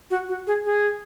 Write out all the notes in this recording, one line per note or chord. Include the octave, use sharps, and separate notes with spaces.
F#4
F#4
G#4
G#4